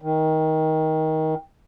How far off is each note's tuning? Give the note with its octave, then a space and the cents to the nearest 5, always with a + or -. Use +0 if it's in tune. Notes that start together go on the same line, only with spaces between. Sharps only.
D#3 +20